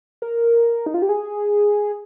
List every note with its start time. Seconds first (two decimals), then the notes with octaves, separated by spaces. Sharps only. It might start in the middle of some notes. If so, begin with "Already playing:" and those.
0.22 A#4
0.86 D#4
0.94 F4
1.02 G4
1.09 G#4